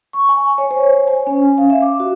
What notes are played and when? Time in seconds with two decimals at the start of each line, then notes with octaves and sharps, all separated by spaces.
0.13 C#6
0.29 G#5
0.58 C#5
0.71 C5
0.93 C5
1.08 G#5
1.27 C#4
1.58 F5
1.70 E5
1.82 D6
2.00 F#4